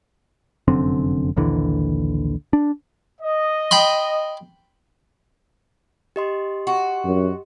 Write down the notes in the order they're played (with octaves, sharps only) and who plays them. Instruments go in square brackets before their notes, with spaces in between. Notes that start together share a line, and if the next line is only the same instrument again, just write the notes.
[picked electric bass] F1 F#2 D3 C4
A#1 D#2 D3 E3
D4
[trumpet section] D#5
[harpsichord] G5 B5 C6
[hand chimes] G4 D#5 C6
[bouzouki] F#4
[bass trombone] F#2